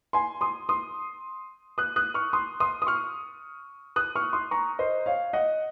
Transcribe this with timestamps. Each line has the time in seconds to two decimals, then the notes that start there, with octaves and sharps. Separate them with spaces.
0.13 G#5 C6
0.41 C6 D#6
0.69 C6 D#6
1.78 D#6 F#6
1.96 D#6 F#6
2.14 C#6 F6
2.33 C6 D#6
2.60 C6 D#6
2.82 D#6
2.87 C#6 F6
3.96 D#6 F#6
4.16 C#6 F6
4.33 C6 D#6
4.51 A#5 C#6
4.79 C5 D#5
5.06 C#5 F5
5.33 D#5 F#5